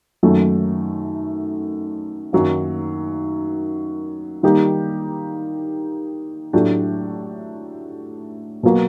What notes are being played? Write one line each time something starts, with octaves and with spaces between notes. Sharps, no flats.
F#2 D#3 F#3 A3
F#2 D#3 F#3 A#3
D#3 G3 A#3 D#4 G4
A2 F#3 A3 D4 G4
B2 F#3 A#3